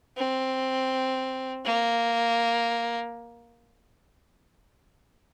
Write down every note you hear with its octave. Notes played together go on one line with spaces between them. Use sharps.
C4
A#3